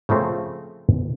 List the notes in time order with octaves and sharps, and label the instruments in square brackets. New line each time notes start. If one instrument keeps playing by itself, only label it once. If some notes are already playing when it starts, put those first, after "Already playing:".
[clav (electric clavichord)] C#3 F3 A3 C4